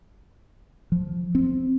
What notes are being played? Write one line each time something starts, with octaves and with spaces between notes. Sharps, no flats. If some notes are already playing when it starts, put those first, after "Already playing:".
F3
C4